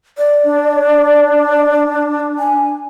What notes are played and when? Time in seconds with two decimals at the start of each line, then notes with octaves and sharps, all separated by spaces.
0.18 D5
0.44 D4
2.39 G#5